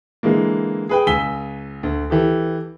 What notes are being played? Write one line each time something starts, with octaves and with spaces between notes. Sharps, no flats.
D3 E3 G#3 A#3
G#4 B4 G5
C#2 G#5 E6 B6 G7
D2
E3 G4 A4